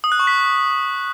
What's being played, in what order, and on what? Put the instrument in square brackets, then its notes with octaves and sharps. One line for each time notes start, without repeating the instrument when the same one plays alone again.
[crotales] D#6
F#6
C#6
B6